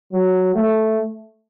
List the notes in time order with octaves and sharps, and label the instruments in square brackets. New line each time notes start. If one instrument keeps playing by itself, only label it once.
[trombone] F#3
A3